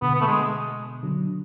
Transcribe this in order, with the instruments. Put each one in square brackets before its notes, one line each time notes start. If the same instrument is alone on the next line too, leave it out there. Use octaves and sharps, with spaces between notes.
[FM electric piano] B2 D3 [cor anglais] B3
[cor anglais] B3
A3
G#3
[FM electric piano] D3 F#3